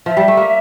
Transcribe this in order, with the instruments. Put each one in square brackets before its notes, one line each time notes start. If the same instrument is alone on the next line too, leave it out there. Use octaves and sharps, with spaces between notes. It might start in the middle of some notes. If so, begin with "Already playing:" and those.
[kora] F3 [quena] E5
[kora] G3
A3
A#3